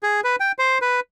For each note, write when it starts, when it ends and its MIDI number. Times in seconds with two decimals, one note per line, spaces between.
0.03 0.21 68
0.24 0.36 71
0.40 0.52 79
0.59 0.78 72
0.82 1.00 71